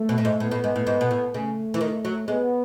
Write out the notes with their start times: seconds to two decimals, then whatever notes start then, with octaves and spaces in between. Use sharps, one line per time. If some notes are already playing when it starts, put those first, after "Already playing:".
Already playing: A3
0.09 B2
0.18 A2
0.25 G#2
0.40 A2 B3
0.51 A2
0.64 G#2
0.76 A2
0.87 G#2
1.01 B2
1.11 A2
1.34 C#3 A3
1.74 E3
1.81 D#3
2.05 F#3
2.28 G#3 B3